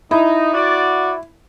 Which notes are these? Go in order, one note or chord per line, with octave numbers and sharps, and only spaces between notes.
D#4 E4
F#4 D5